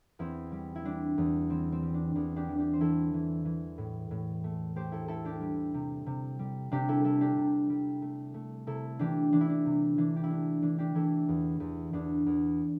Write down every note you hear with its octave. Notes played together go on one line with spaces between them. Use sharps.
E2 C4 E4
G3
E4
G3 D4
E2
E3 C4
C4
G3
D4
E2 D4
D4 G4
E3
D4 G4
C5
E3 E4 A4
E3
E3
A2
A2
A3
A3 G4 C5
E4 A4
A3 E4 A4
D4 G4
G3
C3
C3
G3
C3 D4 G4
E4 A4
G3 E4 A4
D4 G4
C3
G3
A3
A3
C3 E4 A4
E3 D4 G4
E3 D4
E4
D4
C3
E3 D4
G4
E4
A3 D4
E3 D4
D4 G4
E3 E4 A4
E2
E2
E2 D4
E2